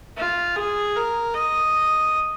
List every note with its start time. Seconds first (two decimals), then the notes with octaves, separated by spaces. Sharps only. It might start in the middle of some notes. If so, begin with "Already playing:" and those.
0.17 F4
0.56 G#4
0.96 A#4
1.34 D#5